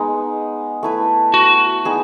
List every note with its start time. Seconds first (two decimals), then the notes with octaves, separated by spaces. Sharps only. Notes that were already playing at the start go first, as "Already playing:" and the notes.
Already playing: G#3 B3 D#4
0.83 A3 E4 B4
1.34 F#4
1.85 B3 D#4 G#4